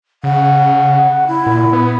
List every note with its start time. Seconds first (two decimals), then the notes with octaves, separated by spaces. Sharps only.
0.24 C#3 F#5
1.27 E4
1.46 A#2
1.73 B3